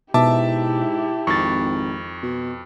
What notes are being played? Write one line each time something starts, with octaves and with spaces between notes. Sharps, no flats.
G#2 B2 E4 G4 E5 A5 D6
G#1 F2 C#6 A6
B2